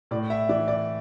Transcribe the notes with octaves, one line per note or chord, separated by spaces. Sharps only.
A2 D5
E5
E3 D5
D5